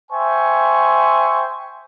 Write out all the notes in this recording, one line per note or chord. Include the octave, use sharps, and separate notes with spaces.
C5 E5 G5 G#5 C#6